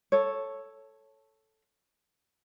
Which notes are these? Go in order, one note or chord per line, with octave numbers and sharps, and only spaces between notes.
A4 C#5